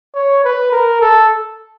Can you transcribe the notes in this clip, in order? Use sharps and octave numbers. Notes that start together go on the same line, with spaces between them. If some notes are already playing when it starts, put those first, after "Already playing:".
C#5
B4
A#4
A4